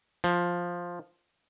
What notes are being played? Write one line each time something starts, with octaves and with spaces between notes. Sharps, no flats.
F3